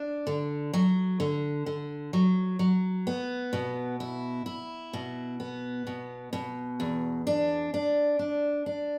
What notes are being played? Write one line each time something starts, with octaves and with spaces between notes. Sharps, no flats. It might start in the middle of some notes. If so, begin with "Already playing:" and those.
Already playing: D4
D3
F#3
D3
D3
F#3
F#3
B3
B2
E4
E4
B2
B3
B2
B2
E2
D4
D4
D4
D4